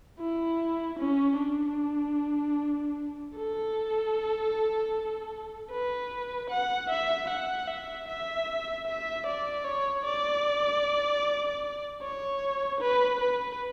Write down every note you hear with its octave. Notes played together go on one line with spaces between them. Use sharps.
E4
C#4
D4
A4
B4
F#5
E5
F#5
E5
E5
E5
D5
C#5
D5
C#5
B4
B4